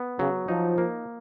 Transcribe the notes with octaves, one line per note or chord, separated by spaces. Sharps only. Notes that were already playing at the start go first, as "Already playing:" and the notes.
Already playing: B3
C#3 F#3
F3 D#4
A#3